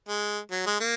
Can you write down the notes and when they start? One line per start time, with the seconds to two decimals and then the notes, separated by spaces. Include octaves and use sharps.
0.08 G#3
0.51 F#3
0.66 G#3
0.80 A#3